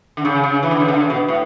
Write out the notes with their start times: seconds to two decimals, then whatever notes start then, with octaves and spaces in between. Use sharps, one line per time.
0.17 D3
0.25 C#3
0.44 C#3
0.63 E3
0.71 D3
0.80 C#3
0.88 D3
1.00 C#3
1.10 B2
1.28 A2